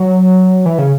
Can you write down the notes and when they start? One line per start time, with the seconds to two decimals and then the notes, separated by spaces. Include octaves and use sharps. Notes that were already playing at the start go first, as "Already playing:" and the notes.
Already playing: F#3
0.66 E3
0.78 C#3